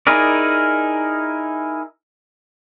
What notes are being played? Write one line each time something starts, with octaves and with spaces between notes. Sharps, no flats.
D#4 E4 G#4 A#4 D5